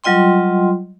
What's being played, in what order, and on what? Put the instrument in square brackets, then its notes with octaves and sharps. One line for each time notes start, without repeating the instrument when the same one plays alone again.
[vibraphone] F#3 G3 F4 D#5 G5 C6